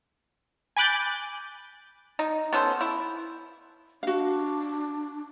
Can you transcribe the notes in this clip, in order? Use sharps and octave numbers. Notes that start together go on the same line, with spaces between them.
G#5 B5 D6 F#6 G6 A6
D#4
B3 C#4 A4 C5
E4
D4 F#4 F5